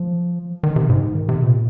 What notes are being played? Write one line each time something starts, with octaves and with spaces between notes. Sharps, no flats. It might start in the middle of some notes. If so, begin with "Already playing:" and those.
Already playing: F3
D#3
C3
G#2
D#3
C3
A#2